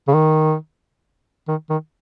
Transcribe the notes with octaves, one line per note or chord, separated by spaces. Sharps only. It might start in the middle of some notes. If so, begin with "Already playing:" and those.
C#3
D#3
D#3
D#3